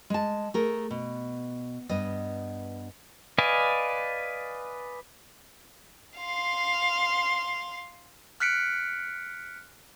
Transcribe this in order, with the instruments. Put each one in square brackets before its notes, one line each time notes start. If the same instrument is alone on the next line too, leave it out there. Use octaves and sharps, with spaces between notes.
[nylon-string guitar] G#3 A5
A3 G#4 A#4
B2
G2 B3 D#5
[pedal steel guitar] B4 D5 D#5 F5 G#5
[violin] F5 C6
[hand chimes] F6 F#6 B6 C#7 D7